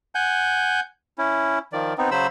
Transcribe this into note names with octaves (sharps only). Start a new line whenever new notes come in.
F#5 G#5 G6
C#4 E4
D#3 F3 D5
B3 C4 D#4
C#3 F#3 C5 B5 E6